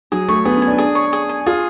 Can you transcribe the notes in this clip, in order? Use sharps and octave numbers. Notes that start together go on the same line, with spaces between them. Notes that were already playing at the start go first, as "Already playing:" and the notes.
F#3 G#4
A3 C#5
B3 G#4
C#4
G#5
D4
D4 G#4
C#5
G#4
G#5
F4 G#4